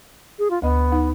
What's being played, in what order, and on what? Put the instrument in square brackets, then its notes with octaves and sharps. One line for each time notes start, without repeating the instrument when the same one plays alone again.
[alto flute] G#4
F4
[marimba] D2 D#5 [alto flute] B3
[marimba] D#4 F#5